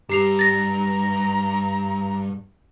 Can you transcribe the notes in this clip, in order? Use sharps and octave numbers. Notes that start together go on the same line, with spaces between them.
G2 G4 A#5 C7 F7
A6 A#6